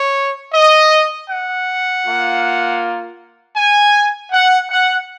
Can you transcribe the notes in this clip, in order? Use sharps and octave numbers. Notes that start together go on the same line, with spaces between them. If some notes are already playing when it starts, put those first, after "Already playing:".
Already playing: C#5
D#5
F#5
A#3 F4
G#5
F#5
F#5